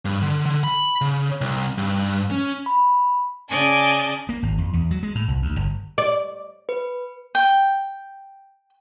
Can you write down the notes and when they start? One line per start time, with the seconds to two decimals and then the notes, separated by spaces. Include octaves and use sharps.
0.05 G2
0.22 D3
0.46 D3
0.64 B5
1.01 C#3
1.41 C2
1.78 G2
2.31 C#4
2.66 B5
3.49 C#3 D5 D#5 G#5 A5
4.29 A#3
4.43 G#1
4.58 F2
4.73 E2
4.91 F#3
5.03 G#3
5.15 A2
5.28 C2
5.42 D2
5.56 G1
5.98 D5
6.69 B4
7.35 G5